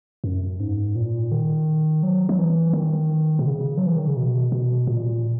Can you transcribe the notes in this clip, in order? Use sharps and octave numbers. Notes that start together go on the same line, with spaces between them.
F#2
G#2
A#2
D#3
F#3
F#3
E3
D#3
B2
C#3
F#3
E3
D#3
C#3
B2
B2
A#2